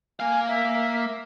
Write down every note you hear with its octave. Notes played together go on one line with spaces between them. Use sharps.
A#3 F5 G#5
E5